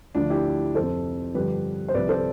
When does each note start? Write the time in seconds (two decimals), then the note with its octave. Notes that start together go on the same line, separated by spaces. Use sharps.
0.15 D2 D3 F3 D4 F4
0.30 E4 G4
0.75 F2 C3 F3 A4 C5
1.35 G2 D3 F3 G4 B4
1.88 C5
1.94 C2 C3 F3 B4 D5
2.09 A4 C5